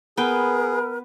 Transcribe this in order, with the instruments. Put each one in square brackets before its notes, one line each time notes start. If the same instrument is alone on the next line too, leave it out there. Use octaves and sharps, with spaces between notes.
[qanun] B3 G5 [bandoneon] G#4 [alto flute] A#4 [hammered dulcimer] B4